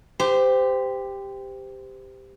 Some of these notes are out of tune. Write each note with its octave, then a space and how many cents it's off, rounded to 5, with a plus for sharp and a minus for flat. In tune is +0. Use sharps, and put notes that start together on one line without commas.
G4 +10 C5 -25